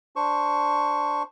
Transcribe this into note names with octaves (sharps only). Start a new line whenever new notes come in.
D4 C5 C#6